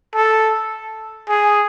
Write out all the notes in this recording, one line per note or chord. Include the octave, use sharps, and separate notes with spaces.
A4
G#4